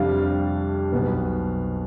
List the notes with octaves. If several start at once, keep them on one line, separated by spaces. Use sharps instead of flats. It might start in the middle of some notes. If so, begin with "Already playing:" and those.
Already playing: F2 C3 G3 D4 F5
B1 B2 B3